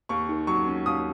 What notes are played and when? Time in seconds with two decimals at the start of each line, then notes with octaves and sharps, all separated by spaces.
0.09 D#2 C#6
0.29 D#3
0.47 F#3 C#6
0.67 C#4
0.86 D#2 D#6